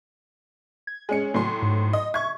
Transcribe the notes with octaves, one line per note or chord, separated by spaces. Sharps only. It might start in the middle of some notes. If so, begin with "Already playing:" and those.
G#6
G#3 C#4 G#5 C#7
A2 F#3 C6
G#2
D#5
E5 C#6 G#6